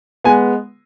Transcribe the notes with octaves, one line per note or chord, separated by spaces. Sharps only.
G#3 B3 G#5